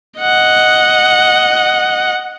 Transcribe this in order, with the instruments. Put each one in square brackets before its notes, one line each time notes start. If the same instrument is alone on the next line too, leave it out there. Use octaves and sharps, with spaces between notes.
[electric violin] D#5 F#5